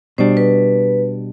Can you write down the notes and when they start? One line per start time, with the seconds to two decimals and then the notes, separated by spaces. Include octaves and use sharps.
0.18 B2 G3 D4 C5
0.37 B4